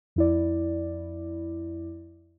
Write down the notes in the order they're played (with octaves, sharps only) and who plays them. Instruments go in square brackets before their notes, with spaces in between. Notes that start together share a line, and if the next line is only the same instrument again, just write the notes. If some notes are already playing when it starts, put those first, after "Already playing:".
[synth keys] F2 E4 D5